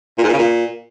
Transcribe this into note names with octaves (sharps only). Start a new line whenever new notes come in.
A#2
G#2
A#2
C#3
A#2